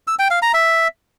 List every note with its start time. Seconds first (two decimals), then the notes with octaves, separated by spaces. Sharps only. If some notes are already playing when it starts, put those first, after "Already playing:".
0.07 E6
0.19 G5
0.31 F5
0.42 A#5
0.54 E5